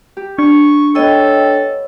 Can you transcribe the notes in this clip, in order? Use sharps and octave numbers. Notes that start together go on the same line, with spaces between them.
G4
D4 C#6
B3 A4 C#5 D#5 G5